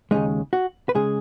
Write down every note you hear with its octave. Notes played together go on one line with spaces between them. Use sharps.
D#2 C#3 G#3 D#4
F#4
B4
C#3 G#3 G#4